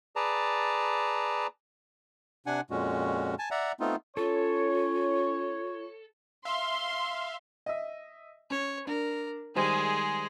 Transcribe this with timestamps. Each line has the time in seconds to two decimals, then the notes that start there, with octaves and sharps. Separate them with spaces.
0.16 G#4 B4 D5 A5 A#5
2.46 C3 D4 F#5 G#5
2.70 F2 A#2 G#3 C#4 F#4
3.39 G#5 A5
3.51 D5 E5 F#5 A#5
3.80 A3 B3 C4 D#4 F4
4.17 C#4 F4 A4 C#5
6.45 E5 F5 C6
7.66 D#5 E5
8.50 C#4 C#5
8.87 D4 A#4
9.55 D#3 G3 G#3 G#4 C5